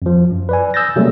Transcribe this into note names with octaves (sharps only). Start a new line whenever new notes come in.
F2 F3
F#2
B4 D5 G#5
D#6 E6 G6 A6 A#6
C3 F#3 G3 A3 A#3 C#4